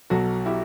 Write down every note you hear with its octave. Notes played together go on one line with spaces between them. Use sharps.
B1 B2 F#3 F#4 A4
E4 G4